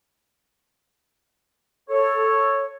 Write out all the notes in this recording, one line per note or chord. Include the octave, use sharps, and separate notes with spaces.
A4 C#5